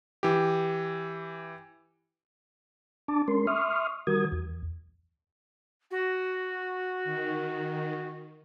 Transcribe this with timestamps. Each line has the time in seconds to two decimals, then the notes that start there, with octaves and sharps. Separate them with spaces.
0.23 E3 G4
3.08 D4 A5 D6
3.28 G#3 C#4 A#4 C6
3.47 E5 C6 C#6 D#6 F6
4.07 D#3 G3 F#4 A#4 D#6 G#6
4.32 E2
5.91 F#4
7.04 D#3